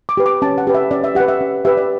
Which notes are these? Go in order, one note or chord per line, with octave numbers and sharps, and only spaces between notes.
D6
G4 B4
D6
C#4 A5
F#5
G4 B4
E5
C#4 D5
E5
G4 B4 F#5
E5
C#4
G4 B4 E5
D5